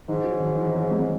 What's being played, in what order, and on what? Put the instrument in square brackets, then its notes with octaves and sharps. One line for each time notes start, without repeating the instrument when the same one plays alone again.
[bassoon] G#2 [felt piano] D#3 D#4
[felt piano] F#3 F#4
D#3 D#4
E3 E4
F#3
G#3